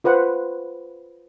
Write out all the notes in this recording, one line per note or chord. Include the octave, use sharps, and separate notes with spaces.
F4 B4 C5 F#5